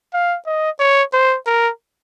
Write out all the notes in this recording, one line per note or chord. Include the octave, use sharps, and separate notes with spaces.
F5
D#5
C#5
C5
A#4